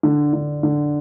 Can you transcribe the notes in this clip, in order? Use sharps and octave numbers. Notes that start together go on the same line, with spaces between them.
D3
D3
D3